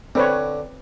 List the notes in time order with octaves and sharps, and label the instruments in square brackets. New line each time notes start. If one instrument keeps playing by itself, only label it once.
[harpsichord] D3 [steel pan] C4 B4 C#5